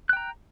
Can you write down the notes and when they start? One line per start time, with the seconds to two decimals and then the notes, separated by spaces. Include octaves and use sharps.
0.09 F#6
0.13 G5
0.17 A#5